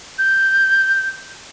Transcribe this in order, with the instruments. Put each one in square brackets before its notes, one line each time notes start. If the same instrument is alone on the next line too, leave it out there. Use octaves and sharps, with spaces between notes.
[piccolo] G6